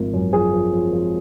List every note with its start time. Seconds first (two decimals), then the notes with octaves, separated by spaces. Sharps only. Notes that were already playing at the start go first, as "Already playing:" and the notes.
Already playing: G#1 F3 A#4
0.13 F#2
0.33 F3 G#4
0.53 F3
0.73 F3
0.92 F3